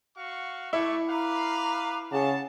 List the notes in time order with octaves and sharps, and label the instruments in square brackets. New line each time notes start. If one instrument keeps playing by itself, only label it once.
[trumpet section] F#4 F5 C#6
[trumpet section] A3 C#6 [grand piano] E4 [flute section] D6
[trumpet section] B4 F5 [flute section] A#5 D6
[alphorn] C#3 [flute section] C#5 F5 F#5 [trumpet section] A5